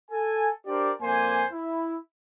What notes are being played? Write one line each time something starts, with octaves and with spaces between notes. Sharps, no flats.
A4 G#5
D4 G4 A#4 C5 D5
F2 A#3 C5 D5 G#5
E4